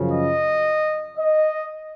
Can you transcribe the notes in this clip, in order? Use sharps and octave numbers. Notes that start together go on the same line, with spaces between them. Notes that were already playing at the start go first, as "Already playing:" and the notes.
Already playing: F#2 C#3 F3
D#5
D#5